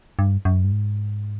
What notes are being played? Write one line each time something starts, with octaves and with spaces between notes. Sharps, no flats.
G2
F#2
G2
G#2